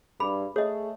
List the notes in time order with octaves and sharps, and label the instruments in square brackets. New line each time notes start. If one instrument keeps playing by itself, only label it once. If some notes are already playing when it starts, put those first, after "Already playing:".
[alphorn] G2 [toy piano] G#4 B5
[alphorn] A3 [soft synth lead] G#4 [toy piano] C#5 D#5